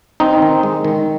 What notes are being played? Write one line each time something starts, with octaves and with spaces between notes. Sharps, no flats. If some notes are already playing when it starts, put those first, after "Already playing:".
C4 D#4
D#3
G#3
D#3